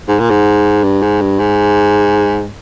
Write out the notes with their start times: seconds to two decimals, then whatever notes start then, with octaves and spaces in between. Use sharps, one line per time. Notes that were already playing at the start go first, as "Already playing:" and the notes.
0.09 G#2
0.19 A#2
0.30 G#2
0.83 G2
1.02 G#2
1.21 G2
1.40 G#2